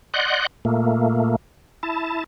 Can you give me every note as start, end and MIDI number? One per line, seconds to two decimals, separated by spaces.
0.14 0.47 74
0.14 0.47 75
0.14 0.47 78
0.14 0.47 84
0.14 0.47 90
0.14 0.47 91
0.65 1.36 46
0.65 1.36 57
0.65 1.36 58
1.83 2.24 64
1.83 2.24 81